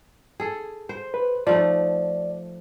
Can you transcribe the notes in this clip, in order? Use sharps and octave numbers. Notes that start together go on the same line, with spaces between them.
G#4 A4
C5
B4
F3 A3 D#4 D5